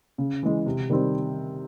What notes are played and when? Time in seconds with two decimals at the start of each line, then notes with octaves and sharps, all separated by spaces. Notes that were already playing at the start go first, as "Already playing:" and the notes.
0.18 C#3
0.43 E3 G#3
0.66 C3
0.89 D#3 G3 C4